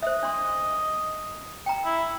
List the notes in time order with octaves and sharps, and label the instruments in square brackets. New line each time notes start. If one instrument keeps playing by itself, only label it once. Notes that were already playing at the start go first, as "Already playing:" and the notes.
[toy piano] C5 E5 [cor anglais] D#5
[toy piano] D4 C6
G5 A#5
[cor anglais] E4